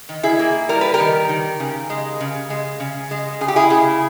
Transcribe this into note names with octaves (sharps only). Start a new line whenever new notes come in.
D#3
E4 G#4
A#3
G3 A#4
B4
G4 A#4
D#3
D#3
C#3
G#3
C#3
G#3
C#3
G#3
C#3 G#4
G4
E4 G#4
C#3